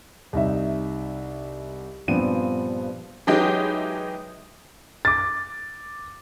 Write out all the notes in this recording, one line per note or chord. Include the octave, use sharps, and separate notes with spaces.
C2 D#4 E5
G2 A#2 F3 B3 C4 D#7
E3 F#3 G#3 D#4 G4 G6
D6 A6